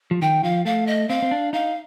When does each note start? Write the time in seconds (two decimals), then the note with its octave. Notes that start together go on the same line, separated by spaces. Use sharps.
0.11 F3
0.22 D#3 G5
0.43 F3 F5
0.65 A3 F5
0.87 D#5
1.09 C4 F5
1.22 C4
1.31 D4
1.53 D#4 F5